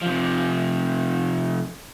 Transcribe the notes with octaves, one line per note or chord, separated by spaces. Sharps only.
C3 F3